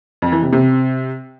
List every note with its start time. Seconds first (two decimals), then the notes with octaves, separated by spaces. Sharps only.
0.22 F2
0.32 E3
0.42 C3
0.53 C3